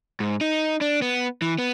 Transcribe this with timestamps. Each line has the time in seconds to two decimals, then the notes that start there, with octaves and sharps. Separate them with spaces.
0.20 G#2
0.41 D#4
0.81 D4
1.02 B3
1.42 E3
1.59 B3